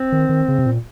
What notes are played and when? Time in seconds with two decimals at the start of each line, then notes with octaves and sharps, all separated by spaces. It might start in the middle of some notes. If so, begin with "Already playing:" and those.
Already playing: C4
0.12 D#3
0.29 D#3
0.48 C#3
0.59 C3
0.66 A#2